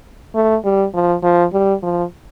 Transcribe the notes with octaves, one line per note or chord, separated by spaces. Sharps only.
A3
G3
F3
F3
G3
F3